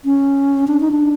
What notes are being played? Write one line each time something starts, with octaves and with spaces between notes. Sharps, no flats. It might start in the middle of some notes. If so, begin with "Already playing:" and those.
C#4
D4
D#4
D4